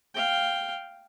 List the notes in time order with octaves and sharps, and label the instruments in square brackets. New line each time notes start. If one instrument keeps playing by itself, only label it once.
[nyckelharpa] F5 G5